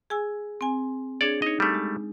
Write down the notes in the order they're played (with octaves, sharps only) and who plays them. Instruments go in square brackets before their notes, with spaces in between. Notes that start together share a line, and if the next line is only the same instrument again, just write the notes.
[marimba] G#4 G#5 E6
C4 G#5
[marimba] D4 G#4 [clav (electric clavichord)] C#5 D5
[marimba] D#4 [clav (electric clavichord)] C#5 D#5
[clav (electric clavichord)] G3 A3
[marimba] G#3